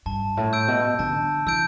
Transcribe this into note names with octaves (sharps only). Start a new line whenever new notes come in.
G2 A5
A2
E6 G6 D7
B2
D3 A5
E3 E6 G6 D7